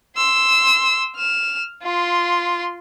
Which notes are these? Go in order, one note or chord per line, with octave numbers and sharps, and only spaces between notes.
C6 E6
F6 E7
F4 C6